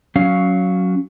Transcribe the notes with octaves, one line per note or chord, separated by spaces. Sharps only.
F#3 C#4 F5